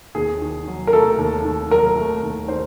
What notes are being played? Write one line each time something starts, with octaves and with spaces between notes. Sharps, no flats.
D#2 G#4
D#3
F#3
A#4
A3 A4
D#2
D#3
F#3 A#4
A3
D#2
D#3 C5